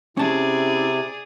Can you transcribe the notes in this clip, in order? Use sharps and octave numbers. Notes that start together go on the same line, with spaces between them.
C3 C#4 E4 G#4 D5 A5